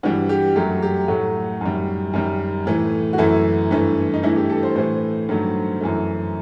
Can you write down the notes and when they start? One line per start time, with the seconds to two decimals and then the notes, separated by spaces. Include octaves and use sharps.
0.03 G2 E3 G3 F#4
0.29 G4
0.55 F#2 F#3 A3 G4
0.82 G4
1.08 A2 F#3 A3 F#4
1.61 F#2 D#3 G3
2.13 F#2 D#3 G3
2.66 A2 E3 A3
3.13 F#4
3.18 F#2 E3 A3 E4
3.71 G2 E3 A3
4.14 D#4
4.23 G2 E3 A3 E4
4.36 G4
4.50 A4
4.63 C5
4.75 A2 E3 A3 C5
5.29 G2 D#3 F#3 A3
5.81 F#2 E3 A3